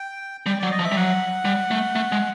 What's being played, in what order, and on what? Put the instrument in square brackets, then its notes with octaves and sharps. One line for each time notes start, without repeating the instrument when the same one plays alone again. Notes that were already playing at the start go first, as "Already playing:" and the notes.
Already playing: [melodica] G5
[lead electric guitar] G3 [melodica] G5
[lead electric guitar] F#3 [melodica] D5
[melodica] D#5
[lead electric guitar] F3
[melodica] E5
[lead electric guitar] G3
[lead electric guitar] F#3 [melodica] F#5
[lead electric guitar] G3
A3
A3
G#3